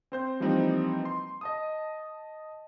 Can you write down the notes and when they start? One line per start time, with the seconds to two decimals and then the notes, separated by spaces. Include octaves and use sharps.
0.12 C4 C5 G6
0.40 E3 F3 G3 A#3 C4 D#4
1.05 C6
1.41 D#5 A5 D#6